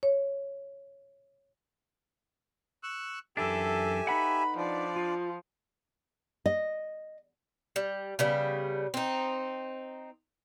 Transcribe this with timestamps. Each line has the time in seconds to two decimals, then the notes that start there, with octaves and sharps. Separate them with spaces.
0.03 C#5
2.83 C#6 E6 F#6
3.37 F#2 E3 D4 G4 A4 E5 G#5
4.07 D#4 B4 F#5 B5
4.57 F3 D4 D5
4.96 F4
6.46 D#5
7.76 G3
8.19 C#3 G3 B3
8.94 C4 D#4